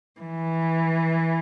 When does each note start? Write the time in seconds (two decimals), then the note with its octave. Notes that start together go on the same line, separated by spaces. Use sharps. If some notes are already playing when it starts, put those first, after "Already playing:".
0.20 E3